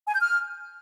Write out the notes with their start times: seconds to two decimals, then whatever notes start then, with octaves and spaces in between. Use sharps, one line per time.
0.07 G#5
0.14 G6
0.20 F6